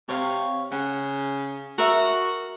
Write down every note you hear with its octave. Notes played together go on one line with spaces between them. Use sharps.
C3 C#5 F5
C#3 F#5
F#4 A#4 E5